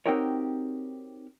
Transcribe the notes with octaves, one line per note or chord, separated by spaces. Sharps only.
C4 D#4 F#4 G4 A#4 C#5